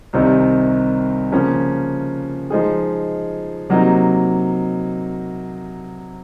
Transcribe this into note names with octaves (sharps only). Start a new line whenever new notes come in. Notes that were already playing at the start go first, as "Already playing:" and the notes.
C2 C3 D#3
C#3 F3 A#3 C#4
F3 G#3 D#4 G#4
C3 F#3 A#3 D#4